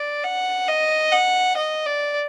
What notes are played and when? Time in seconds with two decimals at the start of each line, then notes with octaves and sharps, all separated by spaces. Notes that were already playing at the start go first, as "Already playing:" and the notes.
Already playing: D5
0.24 F#5
0.68 D#5
1.12 F#5
1.57 D#5
1.86 D5